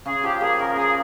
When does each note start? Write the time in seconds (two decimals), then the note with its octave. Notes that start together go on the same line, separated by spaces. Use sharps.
0.06 C#3 G#4
0.23 F3 G4
0.41 A#3 G#4
0.59 C#3 A#4
0.76 A#3 G#4